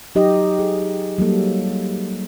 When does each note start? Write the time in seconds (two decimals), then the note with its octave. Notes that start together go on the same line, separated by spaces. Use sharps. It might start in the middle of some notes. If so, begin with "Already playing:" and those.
0.15 F#3 D#4 G4 D#5
0.59 G#4
1.18 F#3 G3 A#3 A4